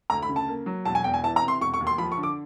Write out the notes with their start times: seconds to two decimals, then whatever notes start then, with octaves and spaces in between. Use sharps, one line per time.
0.10 D2 A#5
0.22 B5
0.29 C#3
0.36 A5
0.49 A#3
0.66 F#3
0.85 E1 A5
0.95 G#5
1.04 E2 G5
1.14 G#5
1.23 E3 A5
1.36 A#5
1.42 C3
1.48 C6
1.61 E1 C#6
1.74 C#6
1.80 D#2
1.87 C6
1.98 F3 B5
2.12 C#6
2.18 D3
2.23 D6